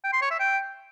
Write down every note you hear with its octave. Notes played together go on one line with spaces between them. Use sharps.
G5
C6
C#5
E5
G5